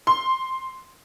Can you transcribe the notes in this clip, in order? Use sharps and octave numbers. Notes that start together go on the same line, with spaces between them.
C6